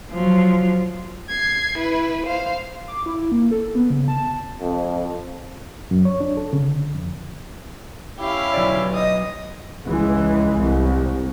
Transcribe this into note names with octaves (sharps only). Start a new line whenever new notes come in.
F3 F#3
G#6 C7
E4 B4
C5 F5
D6
E4
A#3
A4
B3
C#3
A5
F2
F#2
C#5
D4
A4
C#3
D3
F2
C#4 E4 G4 F5
B1 C#5 D5
D#5 D#6
C#2 E3 G#3
C2